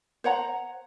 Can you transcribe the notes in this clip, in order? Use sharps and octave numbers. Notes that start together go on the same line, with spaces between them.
C5 C#5 F#5 A#5